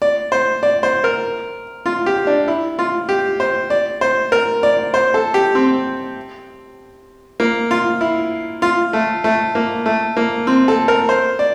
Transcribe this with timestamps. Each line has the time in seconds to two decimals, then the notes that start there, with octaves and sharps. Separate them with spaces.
0.02 D5
0.32 C5
0.63 D5
0.83 C5
1.04 A#4
1.86 F4
2.06 G4
2.27 D4
2.48 E4
2.79 F4
3.09 G4
3.40 C5
3.70 D5
4.01 C5
4.32 A#4
4.63 D5
4.94 C5
5.14 A4
5.34 G4
5.55 C4
7.40 A#3
7.71 F4
8.01 E4
8.62 F4
8.93 A3
9.24 A3
9.55 A#3
9.86 A3
10.17 A#3
10.47 C4
10.68 A4
10.88 A#4
11.09 C5
11.39 D5